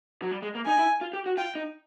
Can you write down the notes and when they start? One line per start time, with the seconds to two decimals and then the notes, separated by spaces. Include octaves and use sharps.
0.22 F#3
0.31 G3
0.42 G#3
0.55 A#3
0.67 D#4 G#5
0.78 E4
1.01 F4
1.13 G4
1.26 F#4
1.37 F4 G5
1.55 D#4